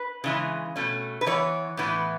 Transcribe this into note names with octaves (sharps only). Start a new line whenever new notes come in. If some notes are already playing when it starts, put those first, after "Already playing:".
Already playing: B4
C#3 E3 G#3
B2 A3 C#4
B4
E3 B3 C#5
A2 E3 B3